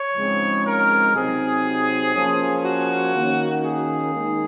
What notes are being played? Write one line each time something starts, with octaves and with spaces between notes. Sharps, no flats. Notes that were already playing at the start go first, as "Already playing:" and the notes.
Already playing: C#5
C#3 F3 G#3 C4 D#4
A#4
C3 F#3 C4 D#4 G#4
F3 A#3 C#4
F#4
D#3 A#3 C#4
G#4
D#3 G#3 D#4